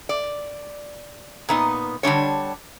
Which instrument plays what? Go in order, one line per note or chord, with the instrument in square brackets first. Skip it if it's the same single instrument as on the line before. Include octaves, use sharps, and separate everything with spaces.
[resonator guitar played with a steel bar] D5
A#2 B3 D#4
D3 G3 D4 C#5